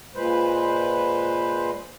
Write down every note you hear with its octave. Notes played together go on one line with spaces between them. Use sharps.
A#2 G#3 B4 C5